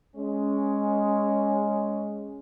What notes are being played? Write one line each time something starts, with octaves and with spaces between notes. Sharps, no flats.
G#3 C#4